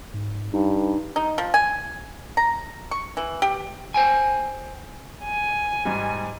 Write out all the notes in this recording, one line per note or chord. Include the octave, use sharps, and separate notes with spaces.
G#2
G2 D#4
D#4
F3
G#5
A#5
C#6
E3
G4
C5 G5 G#5
G#5
G#2 G3